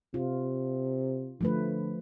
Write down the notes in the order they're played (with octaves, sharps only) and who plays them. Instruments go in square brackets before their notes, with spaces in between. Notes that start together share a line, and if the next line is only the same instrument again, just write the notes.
[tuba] C3 [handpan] F4
[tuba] D3 [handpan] F3 A3 B4